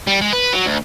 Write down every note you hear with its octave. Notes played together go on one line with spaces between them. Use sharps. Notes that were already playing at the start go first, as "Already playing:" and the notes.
G3
G#3
B4
F#3
D2